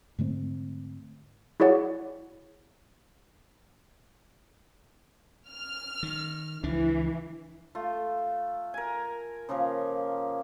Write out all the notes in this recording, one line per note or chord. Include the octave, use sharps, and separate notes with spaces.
G#2 D3 A3 C4
E4 F#4 G#4 C#5 D5 F#5
F6
D#3
C#2 E3 F3 D4
A3 F4
A#4 G#5
C#3 F3 A#3 A#4